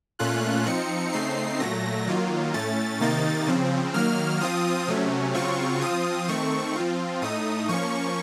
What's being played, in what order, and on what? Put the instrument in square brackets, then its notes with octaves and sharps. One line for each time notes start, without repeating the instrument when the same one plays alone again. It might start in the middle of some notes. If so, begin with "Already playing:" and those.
[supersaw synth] A#2 A3 C#4 F4 F#6
F3 C4 D#4 C#7
C#3 A3 C4 D#4 C7
A#2 F#3 A3 A#6
D#3 F#3 A#3 F4
A2 A3 C#4 A6
C3 D#3 A#3 D#4 A6
C#3 F3 C4
D#3 F#3 A#3 F6
F3 C4 F4 D#6
C3 F#3 A3 C#4
C#3 F#3 C4 F4 C#6
F3 C4 F4 D#6
D#3 A3 C4 C#6
F3 C4 F4
A2 A3 D#4 D#6
F3 A#3 C#4 C#6